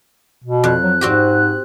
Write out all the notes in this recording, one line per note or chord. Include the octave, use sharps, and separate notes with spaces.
B2
F2 F#6
F#3
G#2 C4 F#4 G4